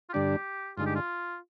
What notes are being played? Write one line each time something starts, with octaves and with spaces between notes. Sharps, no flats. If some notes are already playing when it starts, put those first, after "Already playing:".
F4
G2 D3 G3 D4 G4
G2 D3 G#3 D#4 F4
G4
F4